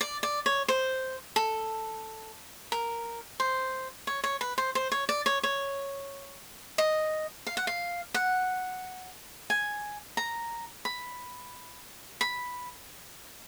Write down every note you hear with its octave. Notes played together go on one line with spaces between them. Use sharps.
D5
D5
C#5
C5
A4
A#4
C5
C#5
C#5
B4
C5
C5
C#5
D5
C#5
C#5
D#5
F5
F#5
F5
F#5
G#5
A#5
B5
B5